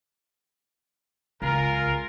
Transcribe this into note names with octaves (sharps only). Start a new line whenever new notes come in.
C#2 F4 G#4 A#4